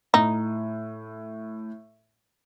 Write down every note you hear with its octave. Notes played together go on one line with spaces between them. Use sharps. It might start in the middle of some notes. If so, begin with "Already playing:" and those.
A2 D#4